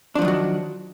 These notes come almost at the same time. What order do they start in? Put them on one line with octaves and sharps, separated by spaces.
D4 F3 F#3 D#3 F#4